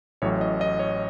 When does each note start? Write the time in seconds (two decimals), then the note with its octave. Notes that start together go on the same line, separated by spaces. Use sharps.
0.22 A1 A2 F#3 C#5
0.41 D#5
0.61 D#5
0.79 C#5